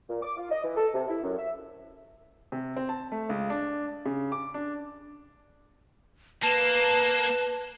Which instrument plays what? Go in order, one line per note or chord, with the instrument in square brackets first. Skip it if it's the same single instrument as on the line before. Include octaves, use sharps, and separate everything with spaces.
[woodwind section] A#2
D6
F4
D#5
E3
A4
C3
E4
F#2
E5
[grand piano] C3
C4
A5
A3
C#2
D4
C#3
D6
D4
[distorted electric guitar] A#3 [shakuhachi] B4 [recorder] A5